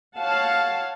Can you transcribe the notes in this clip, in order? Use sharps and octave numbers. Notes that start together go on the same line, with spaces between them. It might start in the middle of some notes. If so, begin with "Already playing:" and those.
C#5 F5 F#5 A5